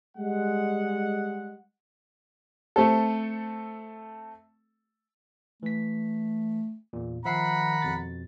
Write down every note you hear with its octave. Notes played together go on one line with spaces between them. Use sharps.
G3 G#3 F#5
A3 C4 A4
E3 A3 B6
E2 A#2
D#3 F3 E5 F#5 A#5 B5 C7
F2 B2 A6